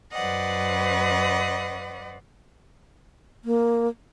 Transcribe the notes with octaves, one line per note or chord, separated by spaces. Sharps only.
F#2 B4 C5 D5 D#5 F#5
A#3